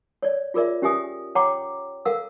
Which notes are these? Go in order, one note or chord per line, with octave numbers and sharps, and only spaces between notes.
C#5 D5
F4 G#4 A#4 D5 E5
C#4 G4 A#4 E5 G#5 D#6
C#5 F#5 G5 A#5 C6 D6
A4 A#4 F5 F#5 E6